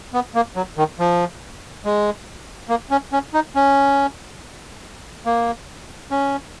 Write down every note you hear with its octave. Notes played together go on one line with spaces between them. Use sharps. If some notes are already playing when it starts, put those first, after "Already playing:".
B3
A#3
F#3
D#3
F3
G#3
A#3
C#4
C#4
D#4
C#4
A#3
C#4